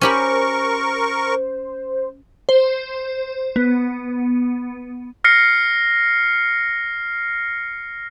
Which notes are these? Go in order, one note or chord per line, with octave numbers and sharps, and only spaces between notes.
C#4 G4 A#4 C5 B5 C#6
C5
B3
F6 A#6 C7 C#7